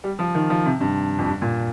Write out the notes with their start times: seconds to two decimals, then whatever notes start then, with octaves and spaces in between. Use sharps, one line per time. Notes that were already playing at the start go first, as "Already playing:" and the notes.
0.04 G3
0.19 F3
0.35 D#3
0.50 F3
0.65 C3
0.80 G2
1.18 F2
1.26 G2
1.42 A#2